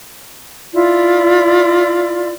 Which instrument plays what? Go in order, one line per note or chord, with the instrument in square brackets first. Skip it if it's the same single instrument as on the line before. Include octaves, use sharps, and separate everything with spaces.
[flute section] E4 F4 D5